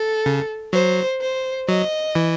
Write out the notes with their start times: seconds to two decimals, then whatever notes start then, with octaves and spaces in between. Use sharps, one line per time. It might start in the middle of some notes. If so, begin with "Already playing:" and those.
Already playing: A4
0.26 C#3
0.73 F#3 C5
1.21 C5
1.68 F#3 D#5
2.15 E3